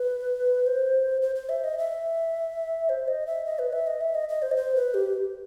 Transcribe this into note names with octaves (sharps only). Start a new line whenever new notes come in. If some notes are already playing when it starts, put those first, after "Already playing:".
Already playing: B4
C5
C5
C5
E5
D#5
E5
C5
D#5
E5
D#5
B4
E5
D#5
E5
D#5
D#5
C5
D#5
C5
B4
G4